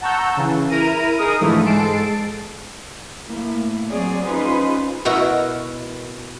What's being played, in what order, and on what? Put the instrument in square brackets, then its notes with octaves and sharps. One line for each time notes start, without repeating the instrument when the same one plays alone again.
[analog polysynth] F#5 A5 A#5 C#6 E6 G6
C#3 E3
E4 A#4 A#5 D#7
D#4 G#4 A#4 D#6
G#2 D3 E3 F3 A3
G#2 G#3 A4 A5 C7 D7
[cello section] A2 A#3 E4
F#3 C4 G#4 C#5 D5
C#4 D#4 F4 G#4 B4 C5
[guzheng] B2 E4 F#4 A#4 A#5